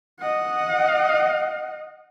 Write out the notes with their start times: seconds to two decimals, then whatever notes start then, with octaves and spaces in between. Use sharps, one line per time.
0.20 D#5 F#5